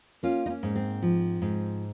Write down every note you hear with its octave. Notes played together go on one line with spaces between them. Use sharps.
A#3 C#4 F4
D#4
C#4
G#2
C4
F3
G#2